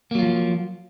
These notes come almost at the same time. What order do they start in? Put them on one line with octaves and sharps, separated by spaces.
A#3 F#3 F4 F3